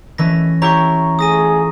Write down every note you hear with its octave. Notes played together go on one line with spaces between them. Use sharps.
E3 A3 C#4 A#6
E4 G4 C#5 A#5 C#6
A3 F4 G#4 D#6 A#6 D#7